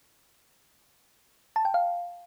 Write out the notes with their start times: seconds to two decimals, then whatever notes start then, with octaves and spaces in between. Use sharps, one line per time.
1.56 A5
1.65 G5
1.74 F5